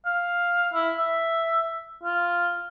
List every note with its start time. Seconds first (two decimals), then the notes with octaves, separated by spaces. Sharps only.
0.06 F5
0.74 E4
0.98 E5
2.03 F4